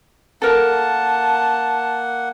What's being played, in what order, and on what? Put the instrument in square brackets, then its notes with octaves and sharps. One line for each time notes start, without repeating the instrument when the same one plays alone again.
[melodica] A#3 F#5 [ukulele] A4 A#4 [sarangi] A5